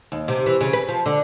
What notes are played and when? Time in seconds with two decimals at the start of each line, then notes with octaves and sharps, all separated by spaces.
0.12 D#2
0.28 C3
0.46 E3
0.61 C#3
0.73 B4
0.88 F3
1.06 D3